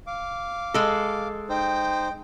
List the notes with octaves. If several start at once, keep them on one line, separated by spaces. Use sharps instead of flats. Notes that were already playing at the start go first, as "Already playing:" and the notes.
F5 D6
G#3 A4
D#4 C5 G5